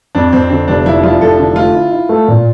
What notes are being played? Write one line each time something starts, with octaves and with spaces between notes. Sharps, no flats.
F2 D4
F2 C4
D3 C4
F1 D4
F3 E4
F3 F4
F1 A4
D3
A3 F4
E4
E4
A3
A#2